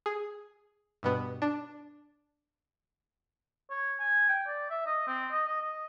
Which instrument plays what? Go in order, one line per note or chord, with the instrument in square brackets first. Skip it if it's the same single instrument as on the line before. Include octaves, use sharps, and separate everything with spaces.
[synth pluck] G#4
G2 B2 B3
D4
[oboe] C#5
G#5
G5
D5
E5
D#5
C4
D#5
D#5
D#5